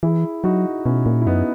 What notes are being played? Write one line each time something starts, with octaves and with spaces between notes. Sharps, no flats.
E3 E4 G#4
F#3 D#4 F#4
B2 C#4 E4
A#2
E4
F#2 B3 D#4